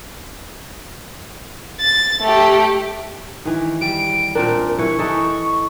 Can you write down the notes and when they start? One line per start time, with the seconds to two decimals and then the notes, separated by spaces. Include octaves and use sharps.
1.81 A6
2.21 A3 G4
3.45 D#3 E3
3.81 G3 D7
4.35 A#2 C4 D4 A#4
4.79 E3 E4 B4 C#6
4.98 E3 D#4 A4